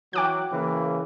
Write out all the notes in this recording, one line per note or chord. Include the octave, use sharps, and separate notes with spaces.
E3 F#3 G5 D6 F#6
C#3 E3 A#3